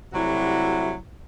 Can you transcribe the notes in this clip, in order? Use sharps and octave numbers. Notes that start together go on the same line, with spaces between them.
C3 F#3 G3 A3 E4 F#4